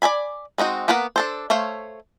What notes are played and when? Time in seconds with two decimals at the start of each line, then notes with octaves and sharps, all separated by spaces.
0.02 D5 E5 G#5 B5
0.58 G#3 C4 D#4 F#4
0.88 A#3 B3 A#4 B4 F#5
1.16 D4 A4 C5
1.50 A3 C5 C#5 F5